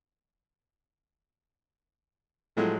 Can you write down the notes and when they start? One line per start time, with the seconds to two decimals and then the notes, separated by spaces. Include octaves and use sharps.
2.57 A2 F3 F#3 G#3